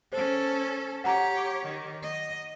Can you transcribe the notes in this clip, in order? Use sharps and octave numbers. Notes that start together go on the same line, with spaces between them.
C#4 A4 C5
G4 C#5 F#5 A#5
D#3
D#5